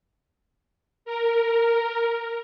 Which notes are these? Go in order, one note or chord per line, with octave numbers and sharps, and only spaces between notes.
A#4